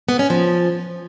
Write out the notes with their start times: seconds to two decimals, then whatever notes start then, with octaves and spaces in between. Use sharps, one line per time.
0.09 B3
0.19 C#4
0.30 F3